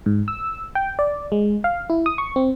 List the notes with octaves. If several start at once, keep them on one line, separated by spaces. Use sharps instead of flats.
G#2
E6
G5
D5
G#3
F5
E4
D#6
C#6
C4